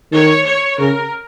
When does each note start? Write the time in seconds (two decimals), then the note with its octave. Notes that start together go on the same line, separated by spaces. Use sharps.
0.12 D#3 C#5
0.46 C#5
0.78 C#3 A#4